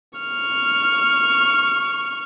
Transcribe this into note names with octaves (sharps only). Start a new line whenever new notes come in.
C#6 F6